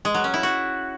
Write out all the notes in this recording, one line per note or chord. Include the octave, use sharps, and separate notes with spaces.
G#3
F#3
C#4
E4
F#4